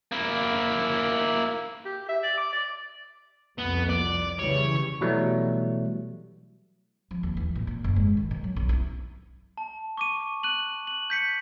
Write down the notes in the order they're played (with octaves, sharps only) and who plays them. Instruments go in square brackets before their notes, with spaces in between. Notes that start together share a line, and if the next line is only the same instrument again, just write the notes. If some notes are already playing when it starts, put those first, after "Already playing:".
[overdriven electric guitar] A#3 E4
[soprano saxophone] G4
E5
D5
D6
D5
[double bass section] C2 F2 [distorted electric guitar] B3
[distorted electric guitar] D5
[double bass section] C#3 E3 G3 [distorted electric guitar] C#5
[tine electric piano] B2 E3 F#3 G3 A3
[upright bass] F3
D#2
E3
A#2
A#2
F#1
G#2
D#3
B2
F#3
B1
E4
[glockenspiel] A5
C#6 D6 D#7
F#6 D#7 F#7
F#7
G6 B6 C#7